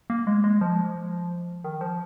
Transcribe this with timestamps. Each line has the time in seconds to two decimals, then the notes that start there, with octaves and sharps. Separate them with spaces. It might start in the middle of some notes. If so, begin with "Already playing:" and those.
0.10 A#3
0.27 G#3
0.44 G#3
0.61 F3
1.64 D#3
1.81 F3